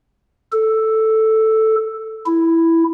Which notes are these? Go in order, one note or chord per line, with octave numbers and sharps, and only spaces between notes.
A4
E4